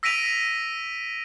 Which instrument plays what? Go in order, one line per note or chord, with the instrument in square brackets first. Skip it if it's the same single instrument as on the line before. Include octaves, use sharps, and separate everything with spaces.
[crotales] E6 A#6 B6 D7 D#7 F7